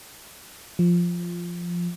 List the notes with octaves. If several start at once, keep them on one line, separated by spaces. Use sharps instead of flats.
F3